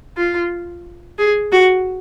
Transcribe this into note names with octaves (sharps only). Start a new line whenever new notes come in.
F4
G#4
F#4